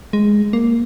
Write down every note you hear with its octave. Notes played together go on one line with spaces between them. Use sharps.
G#3
A#3